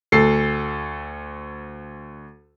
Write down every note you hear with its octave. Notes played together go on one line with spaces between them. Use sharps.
D2 A4 C7